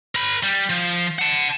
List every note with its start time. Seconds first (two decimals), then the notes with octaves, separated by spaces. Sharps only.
0.15 A#4 B5
0.43 G3
0.70 F3
1.19 F#5 A5